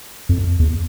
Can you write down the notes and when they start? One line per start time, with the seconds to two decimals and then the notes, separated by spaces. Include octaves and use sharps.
0.29 F2
0.60 E2